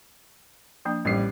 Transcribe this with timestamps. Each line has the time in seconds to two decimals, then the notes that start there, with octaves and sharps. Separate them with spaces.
0.85 F3 A#3 D4
1.05 A1 G3 C7